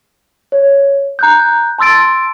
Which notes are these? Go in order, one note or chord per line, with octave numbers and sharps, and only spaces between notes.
C#5
A#5 F#6 G6
A5 C6 E6 A6 D7